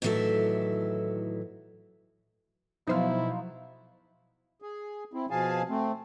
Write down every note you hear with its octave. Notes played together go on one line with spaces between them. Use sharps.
A2 D#3 E3 F#3 A4 E5
B2 F3 F#3 A3 D#4 E4 C5 F5
G#4
C4 E4
B2 F3 G#4 F5 G#5 A5
A3 C4